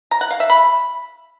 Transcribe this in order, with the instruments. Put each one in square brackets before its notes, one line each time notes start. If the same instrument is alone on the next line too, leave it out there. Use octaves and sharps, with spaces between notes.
[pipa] A#5
F#5
F5
E5
B5